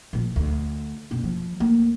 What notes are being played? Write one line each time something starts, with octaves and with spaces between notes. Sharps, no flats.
A#2 F3
D2
F#1 B2
F3
D2 A#3